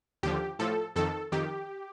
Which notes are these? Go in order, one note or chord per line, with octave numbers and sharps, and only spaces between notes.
D#2 D3 F3 G4
A2 F3 A4
F2 D#3 A4
F2 D#3 G4